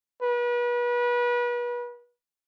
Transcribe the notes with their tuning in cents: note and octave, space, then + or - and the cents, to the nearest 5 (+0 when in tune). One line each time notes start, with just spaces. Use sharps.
B4 -35